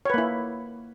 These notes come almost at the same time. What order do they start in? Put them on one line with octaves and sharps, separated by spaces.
C#5 B4 A#3 E4